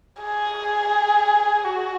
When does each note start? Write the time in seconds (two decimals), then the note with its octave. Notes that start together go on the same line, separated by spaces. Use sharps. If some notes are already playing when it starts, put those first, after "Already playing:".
0.22 G#4
1.64 F#4